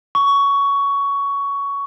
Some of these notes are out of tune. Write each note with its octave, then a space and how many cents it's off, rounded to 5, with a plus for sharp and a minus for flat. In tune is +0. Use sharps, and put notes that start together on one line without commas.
C#6 +15